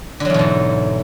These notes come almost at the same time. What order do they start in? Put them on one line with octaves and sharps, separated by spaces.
D3 F#3 E2 B2 G#2